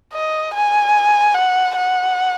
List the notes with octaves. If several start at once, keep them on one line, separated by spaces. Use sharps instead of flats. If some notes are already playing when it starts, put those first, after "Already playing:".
D#5
G#5
F#5
F#5